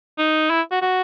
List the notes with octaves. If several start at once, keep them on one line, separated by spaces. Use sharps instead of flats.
D#4
E4
F#4
F#4